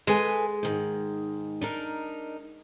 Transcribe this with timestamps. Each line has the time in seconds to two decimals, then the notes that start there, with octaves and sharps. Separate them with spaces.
0.07 G#3 A4 B4 G#5
0.63 G#2 D#3
1.61 D4 D#4 A#4